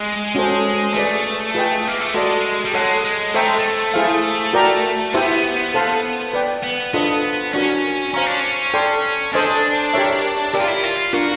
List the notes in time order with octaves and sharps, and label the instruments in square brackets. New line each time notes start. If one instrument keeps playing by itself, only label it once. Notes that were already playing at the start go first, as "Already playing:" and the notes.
Already playing: [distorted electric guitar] G#3
[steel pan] C#4 F#4 A4 C5
[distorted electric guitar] A3 [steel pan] G#4 B4 D5
[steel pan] F4 G#4 B4 D#5 G5
[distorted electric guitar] A#3
A3
[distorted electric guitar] G#3 [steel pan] F#4 A4 D5
[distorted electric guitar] G3
[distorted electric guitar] G#3 [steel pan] A4 C#5 F#5
[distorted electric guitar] G#3
[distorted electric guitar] A3 [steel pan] A4 C5 E5 G5 A#5
[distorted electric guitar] G#3
A3
[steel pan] E4 G#4 C5 F5
F#4 A#4 D5 G5 A#5
[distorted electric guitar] B3 [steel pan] E4 G4 C5 E5
[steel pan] A4 C5 F5 A5 C6
B4 D5 G5
[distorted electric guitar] B3
[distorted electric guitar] B3 [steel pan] D4 F4 A4 C5 D#5
[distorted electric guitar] C#4 [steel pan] D4 F#4 A#4
[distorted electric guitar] C#4 [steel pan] C5 F5 A#5 C#6
[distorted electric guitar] D4
C#4
[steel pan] A4 D5 G5 C6
[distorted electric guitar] D4 [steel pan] A4 C5 D#5 G#5
[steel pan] G4 A#4 C#5 E5
[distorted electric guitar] E4 [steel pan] G4 A#4 D5
[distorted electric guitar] F4
E4
F4
[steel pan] D4 F4 A#4 [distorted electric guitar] F#4